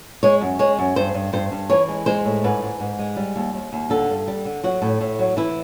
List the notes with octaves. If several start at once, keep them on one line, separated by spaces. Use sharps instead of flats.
G#3 C#5
F#2
G#3 C#5
F#2
G2 C5
G2
G2 C5
G2
E3 C#5
G#3
G#3 C5
A2
G#2 B4
G#2
G#2
G#3
G3
D#2
D#2
D#2
D3 A4
G2
G3
D3
F#3 F#4
A2
A2
F#3
E3 E4